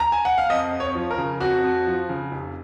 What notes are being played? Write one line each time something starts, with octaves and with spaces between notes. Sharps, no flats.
A#5
G#5
F#5
F5
F2 D#5
F2
C#5
F3
A#4
C#3
F2 F#4
F2
F3
C#3
F1